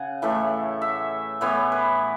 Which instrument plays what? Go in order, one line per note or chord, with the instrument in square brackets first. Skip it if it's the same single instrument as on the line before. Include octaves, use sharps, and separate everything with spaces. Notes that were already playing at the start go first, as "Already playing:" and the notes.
Already playing: [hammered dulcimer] C#3 F#5 G#5
A2 E3 A3
E5
A2 E3 B3 C#5
B4